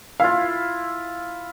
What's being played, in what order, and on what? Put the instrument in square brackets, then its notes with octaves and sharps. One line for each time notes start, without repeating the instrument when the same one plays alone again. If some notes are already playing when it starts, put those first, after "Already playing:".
[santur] E4 F4 [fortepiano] F5